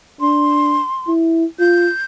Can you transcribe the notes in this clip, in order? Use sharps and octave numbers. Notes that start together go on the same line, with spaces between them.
D4 C6
E4
F4 G6